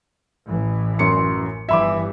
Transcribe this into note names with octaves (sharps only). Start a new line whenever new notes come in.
A1 E3
F#2 C6 C#7
G1 G2 E3 E5 B5 D6